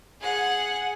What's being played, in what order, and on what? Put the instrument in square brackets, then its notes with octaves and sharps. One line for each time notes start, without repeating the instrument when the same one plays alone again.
[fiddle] G#4 F#5